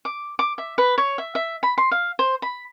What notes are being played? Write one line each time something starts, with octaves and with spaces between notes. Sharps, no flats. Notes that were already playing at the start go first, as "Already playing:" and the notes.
D6
D6
E5
B4
C#5
E5
E5
B5
C6
F5
C5
B5